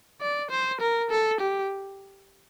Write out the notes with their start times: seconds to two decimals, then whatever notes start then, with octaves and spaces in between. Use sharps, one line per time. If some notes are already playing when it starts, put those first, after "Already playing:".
0.21 D5
0.51 C5
0.81 A#4
1.11 A4
1.41 G4